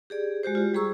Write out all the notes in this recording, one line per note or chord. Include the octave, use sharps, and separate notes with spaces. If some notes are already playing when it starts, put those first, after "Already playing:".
G4 G#4 D5
G#3 F#4 G4 C5
F4 G4
G3 G#4 A#5 C#6 E6